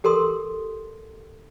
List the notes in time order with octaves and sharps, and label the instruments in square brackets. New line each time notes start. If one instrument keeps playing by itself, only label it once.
[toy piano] G4 A4 A#4 C6 D#6